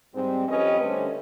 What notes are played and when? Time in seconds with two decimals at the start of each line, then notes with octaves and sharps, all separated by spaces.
0.14 G#2 G3 C4
0.48 F2 C#4 G4 B4 D#5
0.81 D3 G3 A3 C#4 A4 C5